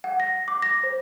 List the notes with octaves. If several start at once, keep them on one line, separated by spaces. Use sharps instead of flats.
F#5
A#6
D6
A#6
C5